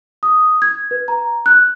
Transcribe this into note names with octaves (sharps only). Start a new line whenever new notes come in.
D#6
G#6
B4
A#5
F#6